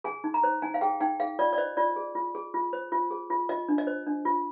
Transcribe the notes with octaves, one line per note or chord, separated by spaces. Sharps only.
G#4 G#5
D#4
A#5
C5
D#4 G#5
F5
G#4 G5
D#4 G5
G#4 F5
F4 D5
D5
C5 D#5
F4 D5
G#4
F4
G#4
F4
C5
F4
G#4
F4
F4 D#5
D4
D#5
C5
D4
F4